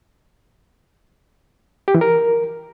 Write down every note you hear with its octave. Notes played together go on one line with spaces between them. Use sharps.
G4
E3
A#4